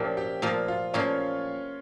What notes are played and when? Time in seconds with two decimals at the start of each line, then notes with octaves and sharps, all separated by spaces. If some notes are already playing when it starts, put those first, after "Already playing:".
Already playing: A#2 F3 A#3 C#4 E4 G4 E5 G5
0.17 G4 G5
0.42 A#2 F3 A#3 F4 F5
0.68 F4 F5
0.94 A#2 F3 A#3 C#4 C#5